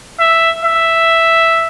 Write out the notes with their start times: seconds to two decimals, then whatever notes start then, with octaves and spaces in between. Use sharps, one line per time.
0.20 E5
0.64 E5